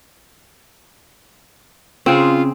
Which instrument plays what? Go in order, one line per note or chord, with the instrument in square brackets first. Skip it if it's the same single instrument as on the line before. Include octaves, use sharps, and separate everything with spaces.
[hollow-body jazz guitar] C#3 G#4 [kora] C4 [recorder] F4